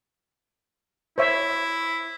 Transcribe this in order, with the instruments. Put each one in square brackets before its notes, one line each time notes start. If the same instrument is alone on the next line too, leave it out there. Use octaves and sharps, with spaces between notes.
[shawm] E4 [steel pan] C5 C#5 E5